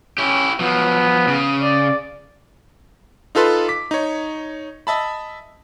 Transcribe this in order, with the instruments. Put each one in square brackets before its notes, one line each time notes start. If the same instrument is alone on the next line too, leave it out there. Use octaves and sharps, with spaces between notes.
[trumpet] C#4 [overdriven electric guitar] E4 G4
[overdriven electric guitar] F3 F#3 [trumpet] B3
[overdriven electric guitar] C#3
[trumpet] D5
[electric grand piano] D#4 F4 A4 B4 C6
D6 B6
D#4 C#5
D#5 E5 A5 B5